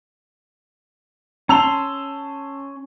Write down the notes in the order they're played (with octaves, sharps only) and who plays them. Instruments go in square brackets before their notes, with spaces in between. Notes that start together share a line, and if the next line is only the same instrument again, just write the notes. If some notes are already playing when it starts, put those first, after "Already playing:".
[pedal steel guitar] C#4 C6 [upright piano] A5 E6 F7